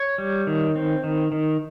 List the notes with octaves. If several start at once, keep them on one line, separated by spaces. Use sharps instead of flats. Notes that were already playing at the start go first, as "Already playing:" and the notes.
Already playing: C#5
G3
D#3
C4
D#3
D#3